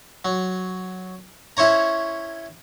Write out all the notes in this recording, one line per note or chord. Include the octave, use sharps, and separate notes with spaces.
F#3
C#4 E4 C5 C#5 A#5